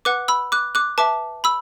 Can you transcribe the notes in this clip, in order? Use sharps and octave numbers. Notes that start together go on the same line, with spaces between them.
B4 F#5 D6 F#6
B5 E6
D6 F#6
D6 F#6
B4 E5 A5 D6
B5 E6